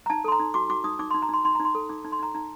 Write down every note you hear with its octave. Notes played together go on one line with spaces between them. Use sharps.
A#5
D#4 A5
A4 C6
A#5
D#4
F#4 D6
F#4 D6
D#4 D#6
D#4 D6
C6
D#4
A#5
D#4 C6
D#4 C6
D#4 A#5
C6
A4
D#4 D6
D#4
C6
D#4 A#5
D#4 A#5